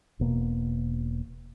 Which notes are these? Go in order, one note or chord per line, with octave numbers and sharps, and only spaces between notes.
E1 B2 A#3